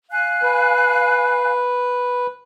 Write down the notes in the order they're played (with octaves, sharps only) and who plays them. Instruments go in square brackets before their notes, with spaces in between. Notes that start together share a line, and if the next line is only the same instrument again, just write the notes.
[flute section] F5 G#5 F#6
[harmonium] B4